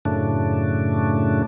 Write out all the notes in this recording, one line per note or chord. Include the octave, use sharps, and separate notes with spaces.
F#2 A2 C#3 A3 D4